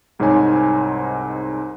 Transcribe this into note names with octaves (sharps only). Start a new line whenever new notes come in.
C2 G#2 C4 D#4 C#5 G#5